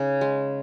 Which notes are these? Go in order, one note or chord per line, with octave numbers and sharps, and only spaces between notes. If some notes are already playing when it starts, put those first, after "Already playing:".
Already playing: C#3 D#4
G#3